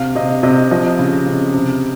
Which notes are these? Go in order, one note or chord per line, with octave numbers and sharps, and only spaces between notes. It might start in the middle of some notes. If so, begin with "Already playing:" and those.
Already playing: C3 F5
C3 D#5
C3 D#5
F3 D#5
C#3
C#3
C3